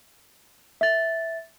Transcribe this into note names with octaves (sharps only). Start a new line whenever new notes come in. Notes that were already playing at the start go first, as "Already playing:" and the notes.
E5 A6